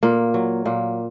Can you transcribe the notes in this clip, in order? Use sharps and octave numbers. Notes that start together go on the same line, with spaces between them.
A#2 A#3
F#3
A#2 A#3